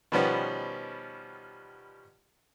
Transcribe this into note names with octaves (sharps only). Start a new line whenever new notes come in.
B2 D#3 F3 G3 B3 C#4